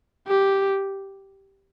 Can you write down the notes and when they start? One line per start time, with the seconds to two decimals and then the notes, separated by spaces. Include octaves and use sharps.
0.27 G4